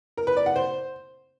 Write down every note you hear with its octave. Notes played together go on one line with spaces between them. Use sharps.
A#4
B4
D5
F#5
C5